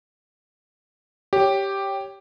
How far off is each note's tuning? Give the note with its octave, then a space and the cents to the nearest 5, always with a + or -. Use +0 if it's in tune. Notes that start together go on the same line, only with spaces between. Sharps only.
G4 +0 C#5 +0